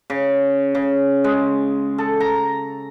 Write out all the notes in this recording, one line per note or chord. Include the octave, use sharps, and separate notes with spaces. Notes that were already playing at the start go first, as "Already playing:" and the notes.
C#3
C#3
G#3
A4
A#5